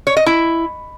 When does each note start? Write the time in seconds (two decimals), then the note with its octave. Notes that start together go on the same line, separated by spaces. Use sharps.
0.07 C#5
0.17 D#5
0.26 E4